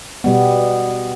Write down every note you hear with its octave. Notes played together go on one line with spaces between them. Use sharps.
B2 G3 B3